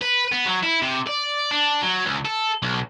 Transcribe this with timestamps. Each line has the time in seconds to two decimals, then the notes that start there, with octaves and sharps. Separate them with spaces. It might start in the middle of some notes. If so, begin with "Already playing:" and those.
0.01 B4
0.32 B3
0.46 F#3
0.63 E4
0.82 C3
1.07 D5
1.51 D4
1.82 F#3
2.05 C#2
2.25 A4
2.62 B1